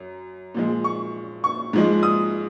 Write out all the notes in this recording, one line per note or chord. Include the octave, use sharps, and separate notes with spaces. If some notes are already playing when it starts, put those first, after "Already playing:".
Already playing: F#2
A#2 F3 G#3
C#6
C#6
G#2 F3 G#3
D#6